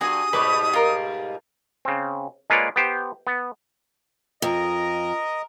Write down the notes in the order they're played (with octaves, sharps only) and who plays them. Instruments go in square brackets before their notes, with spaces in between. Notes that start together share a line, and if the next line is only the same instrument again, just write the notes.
[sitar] G2 [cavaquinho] F#4 G#4 G#5 [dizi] D#6
[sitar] G#2 B2 G3 [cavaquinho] B4 C#6 D6
[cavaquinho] F4 A#4
[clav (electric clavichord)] C#3 C4
G#3 A#3 F4 B4 C#5 D5
B3 G4 C5
B3
[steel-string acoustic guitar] F2 [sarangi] A#4 [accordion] D#5